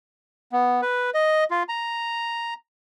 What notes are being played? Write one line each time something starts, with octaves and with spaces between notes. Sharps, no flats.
B3
B4
D#5
F4
A#5